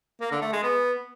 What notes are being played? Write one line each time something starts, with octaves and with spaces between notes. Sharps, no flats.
A#3
D3
A3
G#3
B3